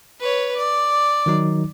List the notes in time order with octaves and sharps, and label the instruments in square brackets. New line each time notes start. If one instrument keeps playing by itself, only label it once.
[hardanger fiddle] B4 C#5
D5
[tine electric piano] D#3 F#3 D#4